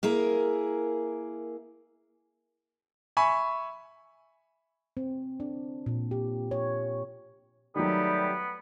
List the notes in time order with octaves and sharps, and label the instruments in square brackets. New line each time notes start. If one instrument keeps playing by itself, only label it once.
[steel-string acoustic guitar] A#3 E4 G#4 A#4
[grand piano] E5 G#5 B5 C#6
[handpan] C4
D4
A#2
G4
C#5
[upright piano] D#3 F#3 [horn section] G3 A3 G4 [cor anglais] B3